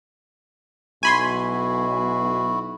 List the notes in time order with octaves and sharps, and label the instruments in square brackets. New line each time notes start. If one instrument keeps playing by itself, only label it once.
[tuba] B1 [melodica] E4 F#4 [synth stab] G#5 B5 C6